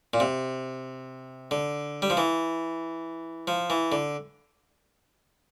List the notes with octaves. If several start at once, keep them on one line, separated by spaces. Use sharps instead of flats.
A#2
C3
D3
G3
F3
E3
F3
E3
D3